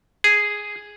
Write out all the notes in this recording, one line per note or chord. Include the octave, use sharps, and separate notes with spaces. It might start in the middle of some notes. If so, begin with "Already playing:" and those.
G#4